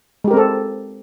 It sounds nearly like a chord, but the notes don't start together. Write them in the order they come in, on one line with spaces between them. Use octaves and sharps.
G#3 G4 A#4 C4 A4